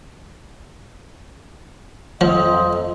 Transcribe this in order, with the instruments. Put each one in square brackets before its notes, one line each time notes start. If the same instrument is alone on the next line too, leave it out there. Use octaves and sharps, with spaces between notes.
[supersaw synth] F2 [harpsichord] F3 [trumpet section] C4 D#5